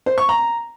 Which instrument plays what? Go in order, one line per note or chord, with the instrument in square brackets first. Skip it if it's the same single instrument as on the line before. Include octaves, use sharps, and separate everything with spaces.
[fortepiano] C5
C#6
A#5